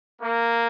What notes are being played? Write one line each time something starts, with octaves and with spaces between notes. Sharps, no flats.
A#3